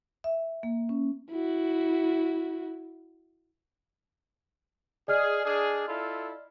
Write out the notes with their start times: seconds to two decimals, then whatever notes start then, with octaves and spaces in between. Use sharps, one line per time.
0.24 E5
0.63 A#3
0.89 C#4
1.31 E4 F#4
5.08 G#4 D5 D#5 F6
5.45 D4 G#4
5.88 E4 F4 A4